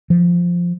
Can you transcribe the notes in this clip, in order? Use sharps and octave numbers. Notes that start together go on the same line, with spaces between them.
F3